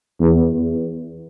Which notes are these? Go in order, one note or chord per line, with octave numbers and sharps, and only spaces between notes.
E2